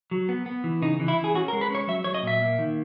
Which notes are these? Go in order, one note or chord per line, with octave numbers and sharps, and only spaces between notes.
F#3
B3
B3
E3
C#3 D#4
E3
E4
E3
G#4
C#4 F#4
A#4
G#3
B4
C#4 C#5
F#3 E5
F#3 C#5
D#5
A#2 E5
A#3
D#3